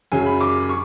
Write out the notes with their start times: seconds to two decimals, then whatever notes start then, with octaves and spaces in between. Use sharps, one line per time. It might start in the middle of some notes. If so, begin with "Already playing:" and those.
0.12 F#2 C#3 F#3 G#5
0.26 B5
0.40 D6
0.69 C#6